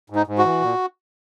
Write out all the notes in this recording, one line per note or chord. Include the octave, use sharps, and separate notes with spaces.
G#2
D#4
G#2
F#4
E3
A#2